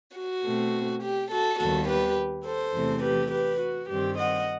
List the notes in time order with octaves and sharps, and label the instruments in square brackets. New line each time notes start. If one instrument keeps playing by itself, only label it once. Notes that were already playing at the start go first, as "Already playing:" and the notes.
[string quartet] F#4
B2 A3 C4
G4
F#4 A4
D#2 D#3 G3 B3 F#4 A4
G4 B4
A4 C5
E2 C3 E3 A3
G4 B4
G4 B4
F#4
G2 D#3 G3 C4 G4
D#5 F#5